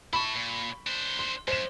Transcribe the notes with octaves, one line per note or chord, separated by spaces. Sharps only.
E4 A5 B5 C#6
A#2
D4 C5
C6
F#2 C5 E7